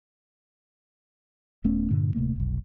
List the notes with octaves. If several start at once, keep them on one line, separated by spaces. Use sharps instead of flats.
D#1 A3 B3 C#4
G2 A#2 D3
D1 C3 A3 A#3
F1 B1